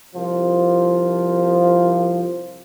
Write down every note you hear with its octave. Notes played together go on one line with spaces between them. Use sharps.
C2 F3